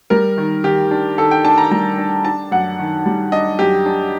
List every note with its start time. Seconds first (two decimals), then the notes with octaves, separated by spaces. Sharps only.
0.10 G3 A#4
0.38 D#3
0.64 D#3 G4
0.91 D4
1.18 D#3 A4
1.31 G5
1.45 D4 A5
1.58 A#5
1.71 G3 A#5
1.98 D4
2.25 D4 A5
2.52 F#2 F#5
2.79 D#3
3.06 G3
3.32 D4 D#5
3.59 F#2 G4
3.86 D4